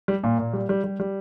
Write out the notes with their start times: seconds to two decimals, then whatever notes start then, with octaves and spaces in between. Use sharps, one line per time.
0.08 G3
0.23 A#2 A#3
0.39 A#2
0.53 G3
0.69 G3
0.84 G3
1.00 G3